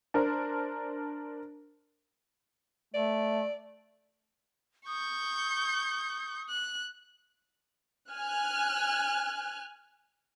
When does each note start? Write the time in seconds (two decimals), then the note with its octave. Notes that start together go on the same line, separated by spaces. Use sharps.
0.14 D4 A#4 C5
2.94 A3 D5
4.87 C#6 D#6 G6
6.49 F#6
8.11 G#5 F6 F#6